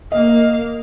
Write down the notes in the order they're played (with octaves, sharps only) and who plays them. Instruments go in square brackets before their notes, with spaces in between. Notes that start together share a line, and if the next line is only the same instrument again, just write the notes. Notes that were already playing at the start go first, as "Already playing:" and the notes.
[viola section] A#3 F5 [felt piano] D#5